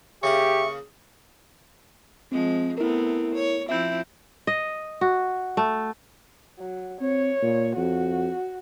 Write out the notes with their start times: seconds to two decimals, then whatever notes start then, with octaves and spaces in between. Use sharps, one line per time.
0.23 C#3 A#3 G4 G#4 E5 C#6
2.32 F3 G#3 C4
2.78 A3 B3 C4 E4 A#4
3.35 C#5
3.69 F3 C4 E4 E5 G6
4.47 D#5
5.01 F#4
5.57 A3
6.58 F#3
7.01 C4 C#5
7.42 A#2
7.77 F2 F#4